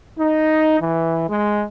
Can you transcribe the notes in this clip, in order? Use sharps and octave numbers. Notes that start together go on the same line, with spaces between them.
D#4
E3
G#3